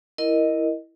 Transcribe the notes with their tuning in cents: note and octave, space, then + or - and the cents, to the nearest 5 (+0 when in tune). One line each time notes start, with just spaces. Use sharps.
E4 +0 A#4 +0 D#5 +0